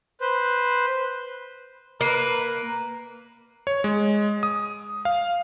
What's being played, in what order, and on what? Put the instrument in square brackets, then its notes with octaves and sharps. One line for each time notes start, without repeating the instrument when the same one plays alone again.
[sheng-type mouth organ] B4 C5
[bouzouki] A#3 [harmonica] B4
[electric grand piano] C#5
G#3
D#6
F5